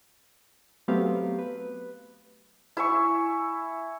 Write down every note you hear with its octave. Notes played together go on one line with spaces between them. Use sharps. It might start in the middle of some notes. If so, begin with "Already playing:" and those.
F#3 A3 B3 C4 G4 F5
B4
E4 E5 G#5 C#6